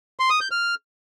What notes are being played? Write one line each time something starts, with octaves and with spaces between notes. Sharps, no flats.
C6
D#6
G6
F6